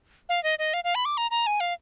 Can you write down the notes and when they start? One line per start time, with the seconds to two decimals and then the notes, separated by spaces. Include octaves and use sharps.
0.29 F5
0.43 D#5
0.59 D#5
0.74 F5
0.84 F5
0.95 B5
1.05 D6
1.17 A#5
1.31 A#5
1.47 G#5
1.60 F5